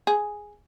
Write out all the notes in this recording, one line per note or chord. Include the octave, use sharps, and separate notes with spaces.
G#4